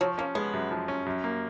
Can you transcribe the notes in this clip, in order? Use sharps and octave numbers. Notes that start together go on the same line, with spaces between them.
F3 F#3
A#3 C#4
G#3 B3
F#2
F3
C#4
F#2
A#3